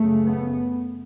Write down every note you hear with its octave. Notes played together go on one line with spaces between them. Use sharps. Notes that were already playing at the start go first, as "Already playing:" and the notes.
Already playing: F#2 C#3 A3
B3